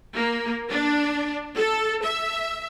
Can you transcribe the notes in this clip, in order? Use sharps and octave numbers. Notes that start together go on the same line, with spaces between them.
A#3
D4
A4
E5